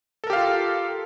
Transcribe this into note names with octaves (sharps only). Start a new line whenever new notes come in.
F4 G4 A4 A#4 F5